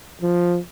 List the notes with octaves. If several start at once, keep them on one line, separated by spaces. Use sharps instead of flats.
F3